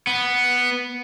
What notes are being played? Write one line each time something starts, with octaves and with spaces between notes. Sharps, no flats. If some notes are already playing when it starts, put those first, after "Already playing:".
B3